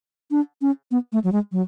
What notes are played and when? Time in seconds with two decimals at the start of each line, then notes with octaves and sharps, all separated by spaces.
0.31 D4
0.62 C#4
0.91 B3
1.13 A3
1.24 F#3
1.32 G#3
1.52 F#3